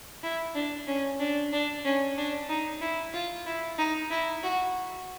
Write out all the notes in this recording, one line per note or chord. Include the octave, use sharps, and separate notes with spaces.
E4
D4
C#4
D4
D4
C#4
D4
D#4
E4
F4
E4
D#4
E4
F#4